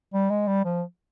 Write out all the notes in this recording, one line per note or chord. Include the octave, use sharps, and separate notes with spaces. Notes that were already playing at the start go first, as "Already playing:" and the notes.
G3
G#3
G3
F3